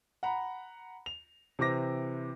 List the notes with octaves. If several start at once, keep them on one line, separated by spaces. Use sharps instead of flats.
F#5 A#5 B5
F7
C3 E3 C4 D6 A#6